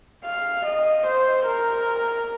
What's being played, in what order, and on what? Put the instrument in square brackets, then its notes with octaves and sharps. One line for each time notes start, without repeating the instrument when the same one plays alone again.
[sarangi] F5
D#5
C5
A#4